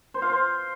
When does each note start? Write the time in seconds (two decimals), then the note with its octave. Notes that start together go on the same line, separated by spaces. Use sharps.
0.14 C5
0.22 F5
0.30 C5